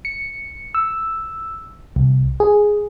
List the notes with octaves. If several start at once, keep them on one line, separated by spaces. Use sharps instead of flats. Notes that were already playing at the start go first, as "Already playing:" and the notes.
C#7
E6
C2
G#4